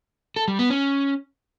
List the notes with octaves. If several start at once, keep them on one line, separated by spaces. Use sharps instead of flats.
A4
G3
B3
C#4